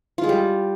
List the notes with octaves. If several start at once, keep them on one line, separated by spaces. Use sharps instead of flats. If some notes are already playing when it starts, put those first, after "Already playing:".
F4
G#3
G3